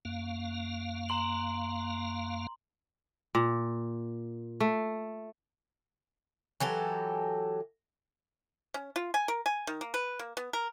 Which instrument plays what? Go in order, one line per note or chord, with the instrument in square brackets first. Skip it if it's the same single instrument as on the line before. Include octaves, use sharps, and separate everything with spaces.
[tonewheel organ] F#2 A#3 F5
[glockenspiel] A#5 C6 F#7
[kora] A#2
A3
[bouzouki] E3 F#3 G4 A4
[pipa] C#4
F4
G#5
A#4
G#5
D#3
A#3
B4
A#3
B3
A#4